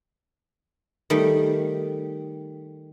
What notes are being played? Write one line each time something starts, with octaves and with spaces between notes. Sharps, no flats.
D#3 G3 A3